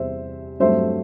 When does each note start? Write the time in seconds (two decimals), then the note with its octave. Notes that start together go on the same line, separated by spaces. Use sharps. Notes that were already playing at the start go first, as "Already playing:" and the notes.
Already playing: E2 C3 G3 C4 C5 E5
0.60 G2 F#3 A3 C4 C5 E5